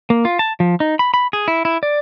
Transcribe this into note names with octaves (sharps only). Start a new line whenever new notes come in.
A#3
F4
A5
F3
D#4
B5
B5
G#4
E4
E4
D5